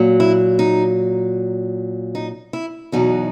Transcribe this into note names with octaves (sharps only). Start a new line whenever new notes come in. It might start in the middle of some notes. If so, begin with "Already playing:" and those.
Already playing: A#2 F#3
E4
D#4
D#4
E4
E2 B2 F#3 D#4